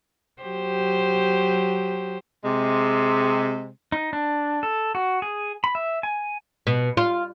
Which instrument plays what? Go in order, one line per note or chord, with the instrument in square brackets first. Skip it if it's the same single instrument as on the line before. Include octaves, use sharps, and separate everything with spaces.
[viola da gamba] F#3 G4 C5
[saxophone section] C3 G#3
[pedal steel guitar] D#4
D4
A4
F#4
G#4
B5
E5
G#5
[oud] B2
F4